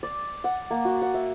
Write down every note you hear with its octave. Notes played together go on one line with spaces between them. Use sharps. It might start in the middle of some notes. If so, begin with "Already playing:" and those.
D5
F#5
A#3
F#4
F#5
E5